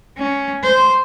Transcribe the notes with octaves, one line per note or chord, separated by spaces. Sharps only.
C#4
C5